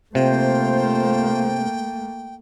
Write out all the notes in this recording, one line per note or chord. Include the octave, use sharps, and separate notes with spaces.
C3 A3 A#3 F4 C5 G5